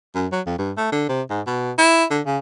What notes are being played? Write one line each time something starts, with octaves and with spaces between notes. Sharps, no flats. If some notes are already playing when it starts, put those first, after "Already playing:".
F#2
F#3
F2
G2
A3
D3
C3
G#2
B2
E4
D3
C#3